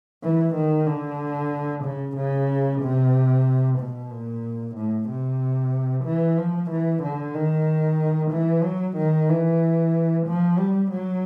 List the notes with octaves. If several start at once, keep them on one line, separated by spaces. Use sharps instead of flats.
E3
D#3
D3
C#3
C#3
C3
B2
A#2
A2
C3
E3
F3
E3
D3
D#3
E3
F#3
D#3
E3
F3
G3
F#3